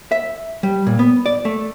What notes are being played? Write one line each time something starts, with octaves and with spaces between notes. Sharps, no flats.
E5
G3
A#2
B3
D5
A3